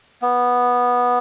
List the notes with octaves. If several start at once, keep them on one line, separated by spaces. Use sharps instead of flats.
B3